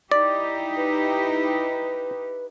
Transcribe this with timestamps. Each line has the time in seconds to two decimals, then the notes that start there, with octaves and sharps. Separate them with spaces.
0.11 D#4 E4 G4 D5
0.76 B4